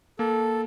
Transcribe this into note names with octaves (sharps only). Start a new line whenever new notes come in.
A#3 A4